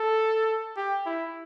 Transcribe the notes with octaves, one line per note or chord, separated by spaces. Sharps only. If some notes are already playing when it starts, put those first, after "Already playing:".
Already playing: A4
G4
E4